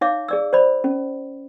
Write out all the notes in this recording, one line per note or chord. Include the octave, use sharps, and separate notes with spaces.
D#4 C#5 E5 F5 D6
G#4 D5 E6
C5 D5 B5
C#4